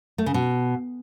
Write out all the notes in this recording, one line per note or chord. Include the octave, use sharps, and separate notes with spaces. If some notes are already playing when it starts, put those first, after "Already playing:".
A3
C#3
B2